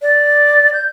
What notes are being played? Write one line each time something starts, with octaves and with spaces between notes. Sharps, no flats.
D5
G6